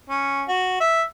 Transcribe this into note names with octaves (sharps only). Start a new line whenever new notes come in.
C#4
F#4
E5